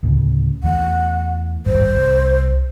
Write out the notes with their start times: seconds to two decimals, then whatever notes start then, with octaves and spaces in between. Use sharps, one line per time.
0.03 D2 A2 C#3
0.63 E2 E3 A3 F#5
1.66 D1 G#1 G2 C5
1.95 C2